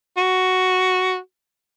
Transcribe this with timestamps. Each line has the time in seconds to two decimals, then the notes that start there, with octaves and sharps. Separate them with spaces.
0.17 F#4